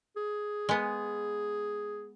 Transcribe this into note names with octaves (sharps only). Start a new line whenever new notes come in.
G#4
G#3 B3